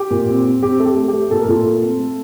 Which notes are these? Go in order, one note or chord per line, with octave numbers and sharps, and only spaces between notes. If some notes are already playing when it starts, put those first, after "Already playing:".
Already playing: G4
A#2
C4
C4
C4 G4
A3
G4
A3
G4
A3
A#2 A4
A#4
A#2 F4 A4
A3
C4
A3